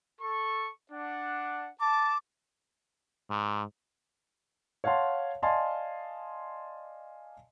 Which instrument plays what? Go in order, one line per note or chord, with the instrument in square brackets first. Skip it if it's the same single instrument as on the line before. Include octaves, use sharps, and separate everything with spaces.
[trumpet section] A4 C#6
D4 F#5
[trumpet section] A5 [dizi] D6
[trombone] G#2
[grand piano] C#5 F5 F#5 A5 C6
D5 D#5 F5 G#5 A5 C6